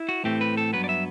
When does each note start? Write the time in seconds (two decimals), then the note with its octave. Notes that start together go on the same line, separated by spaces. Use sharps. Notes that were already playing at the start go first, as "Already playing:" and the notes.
Already playing: E4
0.09 F#4
0.24 A2 E3 A3 C4 G4
0.41 B4
0.57 A4
0.73 G2 F#3 B3 B4
0.84 D5
0.89 E5